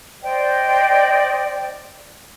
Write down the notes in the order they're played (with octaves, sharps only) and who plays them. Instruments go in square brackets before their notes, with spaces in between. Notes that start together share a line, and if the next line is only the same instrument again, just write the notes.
[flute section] C5 D5 D#5 G5